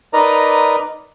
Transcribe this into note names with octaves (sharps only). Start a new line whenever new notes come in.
D#4 A#4 B4 D5 D#5 A#5